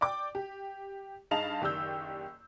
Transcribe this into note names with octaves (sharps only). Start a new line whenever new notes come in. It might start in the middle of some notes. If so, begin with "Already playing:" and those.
D5 G5 D6
G4
G2 D#4 G#4 F5 A5 F7
F#1 D#3 G4 D5 E6 G6